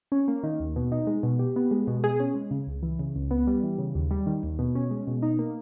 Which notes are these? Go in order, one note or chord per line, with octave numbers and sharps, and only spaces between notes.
C#4
A#3
D#3
D#2
B2
D#4
G#3
B2
G4
B3
G#3
B2
G#4
C#4
G#3
C#3
C#2
E3
C#3
C#2
B3
G3
E3
C#3
D#2
G3
D#3
D#2
B2
C#4
G#3
B2
D#4
A#3